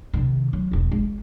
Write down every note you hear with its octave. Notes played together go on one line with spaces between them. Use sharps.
C3 D#3
F#3
E1 C4
G#3